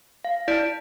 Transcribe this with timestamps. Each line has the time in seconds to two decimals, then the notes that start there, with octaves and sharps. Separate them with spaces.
0.25 F5
0.48 E4 D5 B6 D7